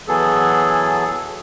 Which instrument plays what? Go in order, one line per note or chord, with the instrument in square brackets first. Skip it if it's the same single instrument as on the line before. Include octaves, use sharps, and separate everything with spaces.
[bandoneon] E3 F#3 B3 G#4 A4